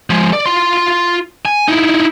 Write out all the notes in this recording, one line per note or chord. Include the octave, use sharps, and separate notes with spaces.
F3 G#3
D5
F4 C6
G#5
D#4 E4